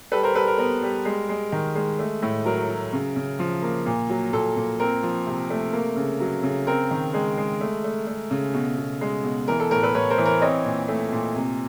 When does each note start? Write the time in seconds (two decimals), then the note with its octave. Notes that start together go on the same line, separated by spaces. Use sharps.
0.12 G3 A4 B4
0.23 A#4 C5
0.35 G3 A4 B4
0.47 A#4
0.58 B3 A#4
0.82 G3
1.05 G#3
1.29 G#3
1.52 D#3
1.75 G#3
1.99 A3
2.22 A2
2.45 F#3 A#4
2.69 F#3
2.93 C#3
3.16 C#3
3.39 F3
3.62 A#3
3.86 A#2
4.10 F#3
4.33 A#2 A4
4.56 A#2
4.80 C4 A#4
5.03 F3
5.27 C3
5.50 A3
5.73 A#3
5.96 C#3
6.20 F#3
6.43 C#3
6.67 C4 A#4
6.91 D#3
7.14 G#3
7.37 G#3
7.61 A3
7.84 A3
8.07 A3
8.31 C#3
8.54 B2
8.78 B2
9.01 G#3
9.24 B2
9.48 E3 A#4
9.60 A4
9.71 A2 A#4
9.83 A4 B4
9.94 A2 B4 C#5
10.10 A#4 C5
10.18 E3
10.25 A#4
10.41 C4 C#5 D#5
10.65 A#2
10.88 A3
11.12 A#2
11.35 C3